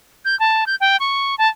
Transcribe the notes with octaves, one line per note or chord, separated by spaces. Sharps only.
G6
A5
G6
G5
C#6
A5